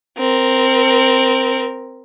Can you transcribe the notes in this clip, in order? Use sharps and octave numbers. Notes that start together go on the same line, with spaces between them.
C4 A#4